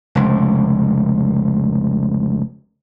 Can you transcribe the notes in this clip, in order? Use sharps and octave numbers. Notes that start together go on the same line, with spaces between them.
F1 C#2